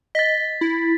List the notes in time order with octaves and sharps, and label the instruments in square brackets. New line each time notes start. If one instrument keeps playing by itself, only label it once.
[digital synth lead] D#5 [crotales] A6 B6
[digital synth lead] E4